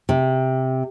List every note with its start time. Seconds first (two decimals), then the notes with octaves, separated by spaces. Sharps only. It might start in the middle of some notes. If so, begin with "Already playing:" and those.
0.09 C3